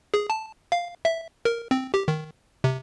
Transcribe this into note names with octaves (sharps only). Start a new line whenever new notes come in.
G#4
A5
F5
E5
A#4
C4
G4
D#3
C3